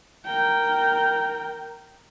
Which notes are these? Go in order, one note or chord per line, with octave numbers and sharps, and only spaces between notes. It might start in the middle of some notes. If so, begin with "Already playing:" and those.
A#4 G5